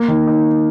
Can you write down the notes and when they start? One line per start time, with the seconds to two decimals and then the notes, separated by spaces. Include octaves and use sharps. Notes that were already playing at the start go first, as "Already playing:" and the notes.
Already playing: A#3
0.08 D#3
0.27 D#4